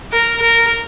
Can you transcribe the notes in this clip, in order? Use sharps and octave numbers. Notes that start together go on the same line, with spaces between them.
A#4
A#4